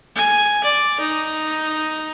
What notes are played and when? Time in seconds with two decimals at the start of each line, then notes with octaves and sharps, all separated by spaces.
0.16 G#5
0.64 D5
1.00 D#4